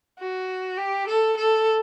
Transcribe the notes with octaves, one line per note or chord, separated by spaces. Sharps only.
F#4
G4
A4
A4